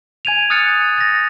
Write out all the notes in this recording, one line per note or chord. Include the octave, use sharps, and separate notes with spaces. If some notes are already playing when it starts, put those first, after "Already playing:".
G#5 G#6 D#7 F7
D#6 F6 F#6 A6 C#7
A6 A#6